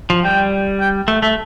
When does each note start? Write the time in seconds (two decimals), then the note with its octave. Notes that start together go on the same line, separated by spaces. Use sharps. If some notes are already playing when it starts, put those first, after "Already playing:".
0.10 F3
0.24 G3 G5
0.80 G5
1.08 A3
1.22 A3 E5